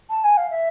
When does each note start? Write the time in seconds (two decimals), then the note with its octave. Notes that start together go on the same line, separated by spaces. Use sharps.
0.10 A5
0.24 G#5
0.37 F5
0.50 E5